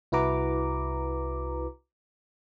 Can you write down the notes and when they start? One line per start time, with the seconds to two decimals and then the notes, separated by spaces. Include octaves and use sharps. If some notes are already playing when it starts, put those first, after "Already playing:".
0.12 C2 E4 F#4 B4 A#5 D6